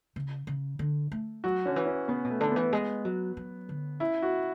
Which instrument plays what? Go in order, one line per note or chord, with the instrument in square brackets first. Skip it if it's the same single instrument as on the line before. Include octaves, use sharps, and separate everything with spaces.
[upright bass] C#3
C#3
D3
A3
[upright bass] F#3 [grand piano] F#4
[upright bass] D3 [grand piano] C#4
[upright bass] E3
[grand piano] C#4
[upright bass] C#3 [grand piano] B3
[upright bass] B2
[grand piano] A3
[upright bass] D3
[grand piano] B3
[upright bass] E3
G#3
F#3
F#3
D3
[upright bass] C#3 [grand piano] E4
[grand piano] F#4